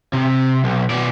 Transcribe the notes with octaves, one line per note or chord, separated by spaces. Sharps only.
C3
B1
B2 D5